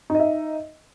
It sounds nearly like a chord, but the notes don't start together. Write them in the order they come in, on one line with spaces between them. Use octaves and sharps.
D#4 D#5 E5